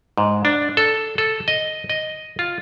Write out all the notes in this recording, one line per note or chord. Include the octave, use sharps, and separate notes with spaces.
G#2
D4
A4
A4
D#5
D#5
F4